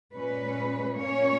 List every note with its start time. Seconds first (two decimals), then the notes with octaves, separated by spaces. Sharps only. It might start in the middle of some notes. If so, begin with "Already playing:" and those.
0.14 A#2 G#3 C#4 B4
0.98 A#2 A#3 C#4 C#5